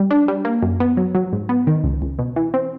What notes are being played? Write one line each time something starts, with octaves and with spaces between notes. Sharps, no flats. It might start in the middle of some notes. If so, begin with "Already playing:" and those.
Already playing: G3
D4
G3
A#3
F#2
B3
F#3
F#3
G#2
B3
D#3
C#2
C#2
B2
E3
C4